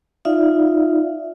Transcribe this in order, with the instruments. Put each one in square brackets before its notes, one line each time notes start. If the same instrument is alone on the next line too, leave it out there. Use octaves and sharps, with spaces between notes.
[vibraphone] D#4 F4 D5 E5 F5